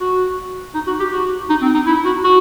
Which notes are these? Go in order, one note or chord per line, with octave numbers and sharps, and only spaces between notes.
F#4
D#4
F#4
G4
F#4
D#4
C4
D#4
E4
F#4
F#4